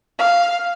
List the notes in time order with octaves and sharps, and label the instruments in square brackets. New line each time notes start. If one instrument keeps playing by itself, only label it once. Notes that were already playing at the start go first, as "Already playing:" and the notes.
[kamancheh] F5